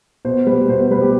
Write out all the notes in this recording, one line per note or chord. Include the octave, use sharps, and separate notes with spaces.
B2 C5
G3 B4
B2 C5
C5
G3 B4
G4